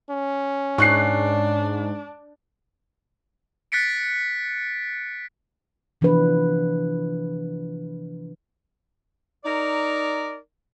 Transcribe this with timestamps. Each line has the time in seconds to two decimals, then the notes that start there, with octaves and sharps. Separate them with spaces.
0.10 C#4
0.78 G#2 D4 C#6 F#6 C7
3.72 F#6 A6 B6 C#7 D7
6.01 C3 E3 F3 D4 B4
9.44 D#4 A#4 D5